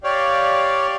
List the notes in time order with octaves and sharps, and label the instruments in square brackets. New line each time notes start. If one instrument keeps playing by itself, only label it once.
[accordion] G4 D5 F5 [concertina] C#5